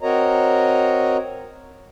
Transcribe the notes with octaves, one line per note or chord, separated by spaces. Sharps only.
C4 F#4 A#4 C#5 D#5 A#5